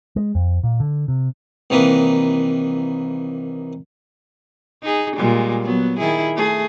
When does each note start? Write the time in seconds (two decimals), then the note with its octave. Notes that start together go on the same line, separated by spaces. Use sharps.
0.16 G#3
0.35 F2
0.63 A#2
0.80 D3
1.08 C3
1.70 C2 D#3 E3 A#3 B4
4.83 D#4 G#4
5.16 A#2 G3 G#3
5.63 F#3 B3
5.99 D#3 E4 G#4
6.37 A3 G#4